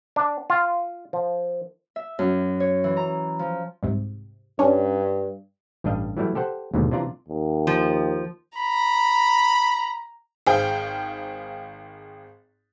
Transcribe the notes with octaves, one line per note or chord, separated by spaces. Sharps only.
D4
F4
F3
E5
F#2
C#5
E3
A#5
F3
C2 G#2 C3
G2 C#4 D4
A1 G2 G3 D4 D#5 F5
E3 F#3 G3 A3 E4
G4 A4 C5 F#5
D#2 G#2 B2 D3
C3 E3 D4 F4 D5 A#5
D#2
F3
A#5 B5
G#1 G#4 C5 F5 G5